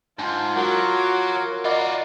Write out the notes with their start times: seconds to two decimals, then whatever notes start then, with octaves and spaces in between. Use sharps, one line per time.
0.19 G#2 D4 F4 G5 A5
0.56 F#3 F#4 A#4 F#5 D6
1.65 F4 F#4 A#4 D5 D#5 F#5 B5 D6